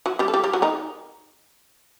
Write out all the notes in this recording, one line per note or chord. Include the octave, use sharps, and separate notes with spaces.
F#3 F#4
G3 G4
A4
G3 G4
G3 G4
F#3 F#4
D#3 D#4